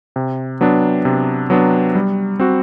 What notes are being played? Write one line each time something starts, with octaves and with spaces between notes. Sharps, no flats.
C3
F#3 B3 D4
C3
F#3 B3 D4
G3
C4 F#4